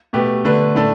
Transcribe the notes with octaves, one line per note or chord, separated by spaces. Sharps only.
B2 A3 G4 B4
D3 A3 D4 B4
A2 A3 D4 A4